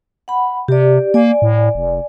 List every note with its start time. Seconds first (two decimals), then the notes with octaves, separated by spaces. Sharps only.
0.28 F#5 B5
0.68 C3 G4 D5
1.14 A#3 D5 G#5
1.42 A2
1.75 F1